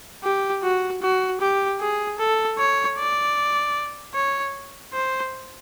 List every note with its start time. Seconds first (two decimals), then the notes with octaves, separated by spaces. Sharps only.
0.24 G4
0.63 F#4
1.02 F#4
1.41 G4
1.80 G#4
2.19 A4
2.59 C#5
2.98 D5
4.15 C#5
4.94 C5